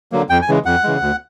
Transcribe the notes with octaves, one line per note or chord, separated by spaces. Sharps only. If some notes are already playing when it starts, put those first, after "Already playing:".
D3 F#3 A#3
F2 G5
G#5
C#3 E3 G#3
F2 F#5
C#3 E3 G#3
D2